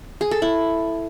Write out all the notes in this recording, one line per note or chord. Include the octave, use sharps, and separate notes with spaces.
G#4
A4
E4